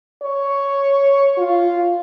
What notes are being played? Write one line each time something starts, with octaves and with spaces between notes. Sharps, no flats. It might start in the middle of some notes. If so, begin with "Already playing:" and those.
C#5
F4